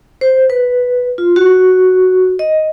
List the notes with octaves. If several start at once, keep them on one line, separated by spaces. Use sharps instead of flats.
C5
B4
F4
F#4
D#5